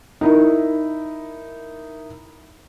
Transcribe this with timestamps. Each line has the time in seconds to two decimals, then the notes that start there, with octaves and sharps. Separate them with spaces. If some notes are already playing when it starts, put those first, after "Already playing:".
0.21 D#4 E4 A#4